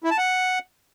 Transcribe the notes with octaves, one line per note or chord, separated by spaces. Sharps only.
E4
A5
F#5